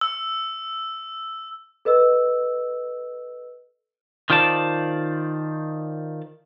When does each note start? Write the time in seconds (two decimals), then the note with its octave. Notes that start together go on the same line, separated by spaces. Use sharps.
0.01 E6
1.85 A4 B4 D#5 E6
4.30 D#3 F4 C5 D5 A5